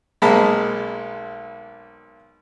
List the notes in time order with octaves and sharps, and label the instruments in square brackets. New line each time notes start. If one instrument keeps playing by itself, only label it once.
[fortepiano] B1 G#3 A#3 C4 A5 B5